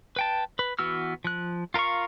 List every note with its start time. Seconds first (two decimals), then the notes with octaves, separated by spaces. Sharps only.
0.16 B4 G5 A5
0.59 B4
0.79 E3 B3 F#4 E6 F6
1.24 F3 F#6
1.74 F4 A#4 B4 F5 C#6